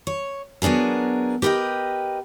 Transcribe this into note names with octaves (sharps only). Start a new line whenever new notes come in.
C#5
F#3 B3 D4 G#4 A#4
G4 A#4 B4 D#5 G5